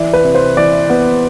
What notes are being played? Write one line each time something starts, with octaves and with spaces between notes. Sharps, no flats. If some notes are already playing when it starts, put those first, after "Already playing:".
Already playing: E3 D5
B4
C3
C5
E3 D5
B3